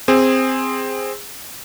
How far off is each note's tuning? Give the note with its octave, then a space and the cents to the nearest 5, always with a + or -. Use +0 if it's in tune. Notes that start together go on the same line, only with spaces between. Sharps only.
C4 +0 G#4 -15